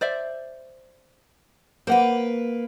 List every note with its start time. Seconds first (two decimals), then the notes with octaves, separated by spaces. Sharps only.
0.01 C5 D5 E5
1.87 A#3 B4 C5 F#5